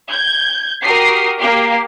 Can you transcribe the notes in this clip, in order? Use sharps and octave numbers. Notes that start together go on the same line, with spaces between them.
G6 G#6
F#4 G4 A#4 D#6 C7
A#3 G4 C7